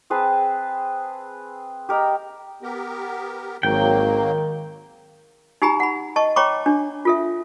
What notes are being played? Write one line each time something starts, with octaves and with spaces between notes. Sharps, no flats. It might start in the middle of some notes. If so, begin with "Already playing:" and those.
C4 G#4 B4 A5
G4 A#4 D#5 G5
B3 G4 A#4
G#1 D#3 F#3 A#3 G5
D#4 G4 G#5 A#5 B5
F#5 B5
D#5 A5 C#6
C#5 G5 A#5 B5 C#6 D6
D4
F4 A4 E5